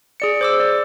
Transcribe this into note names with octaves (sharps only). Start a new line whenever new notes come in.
G#4 D5 C#7
C5 D6 E6
D5